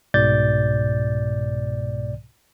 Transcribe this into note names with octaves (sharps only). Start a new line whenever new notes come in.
C2 G#2 B2 D5 G6 A6